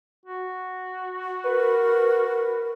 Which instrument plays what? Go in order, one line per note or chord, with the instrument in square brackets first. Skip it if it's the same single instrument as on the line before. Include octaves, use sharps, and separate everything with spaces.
[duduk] F#4
[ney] A#4 [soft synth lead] B4